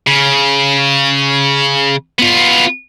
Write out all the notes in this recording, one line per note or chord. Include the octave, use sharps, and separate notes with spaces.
C#3
B3 F4